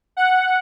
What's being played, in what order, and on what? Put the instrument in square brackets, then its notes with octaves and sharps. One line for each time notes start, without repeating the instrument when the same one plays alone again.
[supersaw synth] F#5